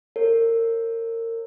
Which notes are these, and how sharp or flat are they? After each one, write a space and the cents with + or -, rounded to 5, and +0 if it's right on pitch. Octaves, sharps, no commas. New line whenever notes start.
A#4 -30 C#5 -30